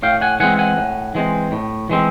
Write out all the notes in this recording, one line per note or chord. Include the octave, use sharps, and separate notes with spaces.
A2 F5 G5
F#5 G#5
E3 G#3 C4 F#5 G#5
F#5 G#5
A2
E3 G#3 C4
A2
E3 G#3 C4